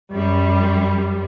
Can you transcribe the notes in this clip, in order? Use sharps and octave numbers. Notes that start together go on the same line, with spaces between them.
F#2 G3